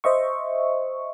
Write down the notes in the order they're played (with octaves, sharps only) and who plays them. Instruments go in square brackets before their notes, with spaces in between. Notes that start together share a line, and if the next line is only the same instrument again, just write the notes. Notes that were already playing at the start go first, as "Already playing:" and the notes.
[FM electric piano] C5 D#5 E5 C#6